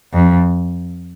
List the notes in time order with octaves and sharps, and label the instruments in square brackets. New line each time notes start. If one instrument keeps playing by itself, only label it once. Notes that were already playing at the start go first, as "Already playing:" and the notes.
[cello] F2